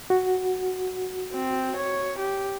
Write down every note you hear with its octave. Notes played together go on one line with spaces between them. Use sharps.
F#4
C4
C#5
G4